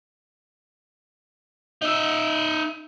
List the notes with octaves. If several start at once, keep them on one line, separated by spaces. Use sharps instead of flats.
D#4 E5